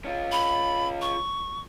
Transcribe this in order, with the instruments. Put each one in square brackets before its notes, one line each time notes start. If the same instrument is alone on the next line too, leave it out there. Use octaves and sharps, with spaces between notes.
[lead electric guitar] C#4 F4
[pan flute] B5
C#6